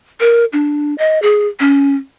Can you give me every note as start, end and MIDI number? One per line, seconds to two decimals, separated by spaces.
0.20 0.45 70
0.53 0.95 62
0.98 1.21 75
1.22 1.47 68
1.60 1.95 61